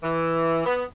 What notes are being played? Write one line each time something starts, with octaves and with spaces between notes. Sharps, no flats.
E3
B3